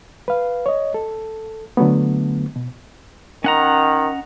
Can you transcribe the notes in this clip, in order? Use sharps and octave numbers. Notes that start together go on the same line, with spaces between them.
B4 F5
C#5 D#5
A4
D3 F#3 A3 B3
B2
D#3 C#4 F#5 A#5